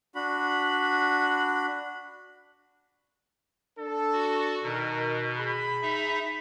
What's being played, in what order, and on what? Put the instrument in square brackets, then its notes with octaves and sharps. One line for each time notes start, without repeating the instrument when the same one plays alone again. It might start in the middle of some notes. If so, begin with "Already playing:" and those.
[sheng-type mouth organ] D4 F#4 B5
[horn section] D4 A4
[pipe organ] F#4
[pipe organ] B2 [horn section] D#3 A#4
[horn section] G#4 B5
[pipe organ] D#4 E5